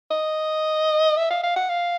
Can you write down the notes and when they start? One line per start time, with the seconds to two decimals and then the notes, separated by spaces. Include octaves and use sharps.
0.11 D#5
1.17 E5
1.30 F5
1.43 F5
1.56 F#5
1.69 F5